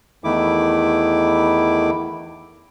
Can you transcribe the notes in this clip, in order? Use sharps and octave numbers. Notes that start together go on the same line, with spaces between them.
E2 D#3 A3 E4 D6